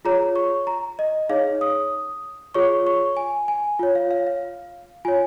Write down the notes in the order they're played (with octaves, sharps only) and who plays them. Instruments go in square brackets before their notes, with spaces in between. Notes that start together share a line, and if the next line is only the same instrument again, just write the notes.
[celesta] F4 G#4 C#5 A#5
C#6
A#5
D#5
D#4 G#4 C#5 F5
D#6
F4 G#4 C#5 C#6
C#6
G#5
G#5
F4 C#5
F5
F5
F5
F4 C#5 G#5